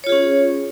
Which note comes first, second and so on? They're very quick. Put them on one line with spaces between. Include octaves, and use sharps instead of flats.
C#5 F4 G#4 C#4